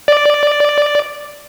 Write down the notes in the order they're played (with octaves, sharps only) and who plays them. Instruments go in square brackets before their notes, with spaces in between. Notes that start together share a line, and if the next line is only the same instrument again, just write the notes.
[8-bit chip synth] D5